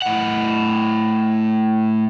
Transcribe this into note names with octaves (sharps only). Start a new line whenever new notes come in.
A2 F#5